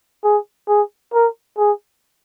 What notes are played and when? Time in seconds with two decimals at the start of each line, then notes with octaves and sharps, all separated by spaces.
0.24 G#4
0.68 G#4
1.14 A#4
1.58 G#4